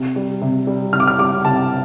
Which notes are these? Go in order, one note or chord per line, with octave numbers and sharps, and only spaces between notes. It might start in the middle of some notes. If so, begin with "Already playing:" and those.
Already playing: C3
G3
C3
G3
C3 F6
D6
F6
G3 D6
C3 A5